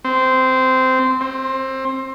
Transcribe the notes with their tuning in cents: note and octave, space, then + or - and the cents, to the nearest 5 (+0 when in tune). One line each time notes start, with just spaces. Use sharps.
C4 -15
C4 +20